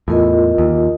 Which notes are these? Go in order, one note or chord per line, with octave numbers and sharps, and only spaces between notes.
E2 A2 F4 A#4 D#5
D#2